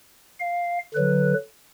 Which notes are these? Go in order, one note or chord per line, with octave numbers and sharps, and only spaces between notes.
F5
D3 F#3 B4